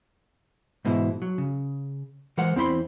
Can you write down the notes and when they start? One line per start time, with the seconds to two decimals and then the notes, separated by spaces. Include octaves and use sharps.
0.85 G#2 B2 E3 G#3 E4
1.22 F#3
1.38 C#3
2.38 E3 G#3 A#4 C5 F#5
2.55 E2 C4 E4 C5 B5 C6